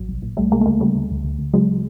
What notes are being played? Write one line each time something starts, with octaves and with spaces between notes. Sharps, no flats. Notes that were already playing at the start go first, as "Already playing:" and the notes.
Already playing: A1 F#3
C2
A#2
C2 G3 A3
C2 G#3 A#3
A3
D2 G#3 A#3
C#3 G3 A3
D2
D2
D2
D2
C#3 F#3 G#3